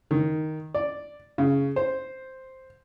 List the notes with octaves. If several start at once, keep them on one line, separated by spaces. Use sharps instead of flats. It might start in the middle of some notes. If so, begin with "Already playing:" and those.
D#3
D5
C#3
C5